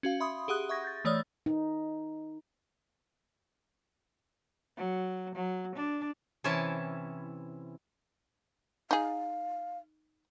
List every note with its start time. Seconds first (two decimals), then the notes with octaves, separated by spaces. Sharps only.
0.03 C#4 F#4 F5
0.20 E5 B5 C6 D#6
0.48 G4 G#4 F#5 D#6 F#6
0.69 E5 C#6 G#6 A#6
0.84 G6 A6
1.05 E3 A3 C#5 D5 D#6 F6
1.46 D#4
4.77 F#3
5.36 F#3
5.76 D4
6.44 C3 E3 C#4 E4 A5
8.91 D#4 G#4 F5